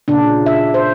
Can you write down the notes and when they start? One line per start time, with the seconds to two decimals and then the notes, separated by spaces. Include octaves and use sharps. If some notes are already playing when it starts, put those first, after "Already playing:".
0.08 A#2 C#3 D4
0.46 E5
0.74 C5